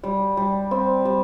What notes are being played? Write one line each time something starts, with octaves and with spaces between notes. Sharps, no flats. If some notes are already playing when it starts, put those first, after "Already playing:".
G3
G3
C4
G3